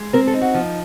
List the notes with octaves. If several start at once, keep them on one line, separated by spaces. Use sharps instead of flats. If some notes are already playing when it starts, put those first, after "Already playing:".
Already playing: G#3
C4 A#4
A4
D#4
F#4
F3